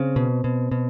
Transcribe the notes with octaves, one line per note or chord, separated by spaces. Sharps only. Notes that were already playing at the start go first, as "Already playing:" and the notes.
Already playing: C#3 C4
B2
B2
B2